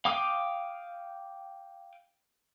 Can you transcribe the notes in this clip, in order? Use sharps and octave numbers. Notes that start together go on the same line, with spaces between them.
F5 G5 D6 D#6